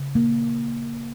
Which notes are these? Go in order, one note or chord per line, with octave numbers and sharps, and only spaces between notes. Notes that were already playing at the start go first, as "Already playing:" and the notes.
Already playing: C#3
A#3